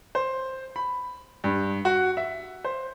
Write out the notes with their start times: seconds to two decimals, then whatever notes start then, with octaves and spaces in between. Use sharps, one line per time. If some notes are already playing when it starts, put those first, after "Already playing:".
0.15 C5
0.76 B5
1.44 G2
1.85 F#4
2.17 E5
2.64 C5